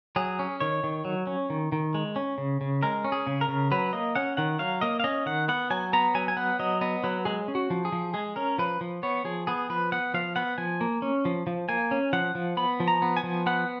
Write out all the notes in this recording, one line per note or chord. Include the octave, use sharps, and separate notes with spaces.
F#3 G#4
C#4
D#3 C#5
D#3
F#3
C#4
D#3
D#3
G#3
C#4
C#3
C#3
G#3 A#4
C#4
G#4
C#3
A#4
C#3
F#3 B4
A#3 D#5
C#4 F#5
D#3 F#5
F#3 F5
A#3 D#5
F5
C#4 D#5
D#3 F#5
B3 F#5
F#3 G#5
B3 A#5
F#3 G#5
G#5
B3 F#5
F#3 D#5
B3 D#5
F#3 B4
G#3 G#4
C#4
F#4
F3
G#4
F3
G#3 G#4
C#4 A#4
F3 B4
F3
B3 C#5
F3 G#4
B3 G#4
F3 B4
B3 F#5
F3 F5
B3 F#5
F3 G#5
A#3
C#4
F3
F3
A#3 G#5
C#4
F3 F#5
F3
B3 B5
F3
A#5
B3
G#5
F3
B3 F#5